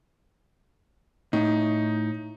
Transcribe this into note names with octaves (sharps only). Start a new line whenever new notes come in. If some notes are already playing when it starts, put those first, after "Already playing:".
A2 D#4